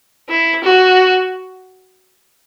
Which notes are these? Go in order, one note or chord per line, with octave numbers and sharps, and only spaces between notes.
E4
F#4